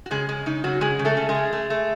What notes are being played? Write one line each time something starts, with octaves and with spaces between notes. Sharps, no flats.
F#4
C#3 G#3 G#4
C#3 G#3 G#4
C#3 D#4
C#3 F#3 F#4
C#3 G#3 G#4
C#3
A3 A4
C#3
G#3 G#4
A3
A3
A3